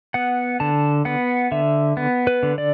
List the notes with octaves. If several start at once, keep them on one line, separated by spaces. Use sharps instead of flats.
B3 F#5
D3 A5
B3 F#5
D3 E5
B3
B4
D3
D5